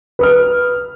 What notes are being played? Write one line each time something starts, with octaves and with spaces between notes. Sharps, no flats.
B4 D#6 F6